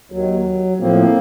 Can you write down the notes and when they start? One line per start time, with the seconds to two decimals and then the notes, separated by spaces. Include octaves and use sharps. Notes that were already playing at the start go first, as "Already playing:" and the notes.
0.12 D#2 D#3 F#3
0.80 A2 F3 A#3 C4